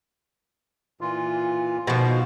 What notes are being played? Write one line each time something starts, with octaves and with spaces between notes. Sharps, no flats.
A#2 E3 F4
B2 D#3 F3 G#3